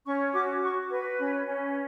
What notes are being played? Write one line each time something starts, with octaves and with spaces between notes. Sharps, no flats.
C#4 C#6
F#4 D6
F#4 C#6
B4
C#4
C#4